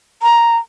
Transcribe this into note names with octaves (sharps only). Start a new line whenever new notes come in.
A#5